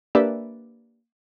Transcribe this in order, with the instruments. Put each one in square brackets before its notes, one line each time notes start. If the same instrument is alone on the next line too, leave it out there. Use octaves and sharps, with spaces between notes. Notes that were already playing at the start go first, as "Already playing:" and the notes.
[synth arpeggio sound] A#3 D4 G4 B4 D5 E5